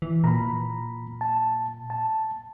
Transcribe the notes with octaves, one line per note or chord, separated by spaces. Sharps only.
E3
A#2 A#5 B5
A5
A5